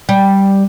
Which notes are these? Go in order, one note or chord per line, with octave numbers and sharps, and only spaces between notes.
G3